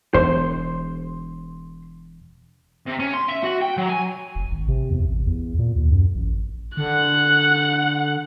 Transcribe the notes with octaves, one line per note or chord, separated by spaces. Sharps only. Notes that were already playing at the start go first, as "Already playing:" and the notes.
E1 C5
C3
C#4
C6
E5
F#4
G5
F#3
G#5
F1
G#1
C3
E2
A1
E2
A#2
D#2
F#2
A1
D3 F#5 F#6